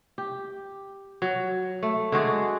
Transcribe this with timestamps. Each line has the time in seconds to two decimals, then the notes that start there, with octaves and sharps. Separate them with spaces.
0.18 G4
1.22 F#3
1.83 A3
2.12 D3 G#3 F#4 G#4